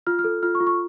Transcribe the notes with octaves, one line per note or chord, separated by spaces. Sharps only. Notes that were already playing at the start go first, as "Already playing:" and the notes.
F4 F6
F6
A4
F4 F6
C#6
F4
C#6